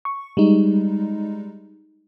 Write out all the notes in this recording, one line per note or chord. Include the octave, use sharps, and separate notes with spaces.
C#6
G3 G#3 D#4